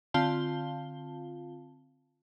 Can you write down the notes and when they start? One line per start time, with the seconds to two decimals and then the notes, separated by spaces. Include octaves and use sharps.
0.14 D3 C4 F4 F5 A5 G7